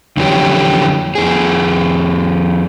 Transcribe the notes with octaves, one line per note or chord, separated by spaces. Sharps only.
F2 D3 E3 F#3 C#4 G4
F2 G#4